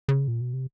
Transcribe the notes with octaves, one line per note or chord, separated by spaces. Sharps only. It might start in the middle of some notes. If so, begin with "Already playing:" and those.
C#3
A#2
B2
C3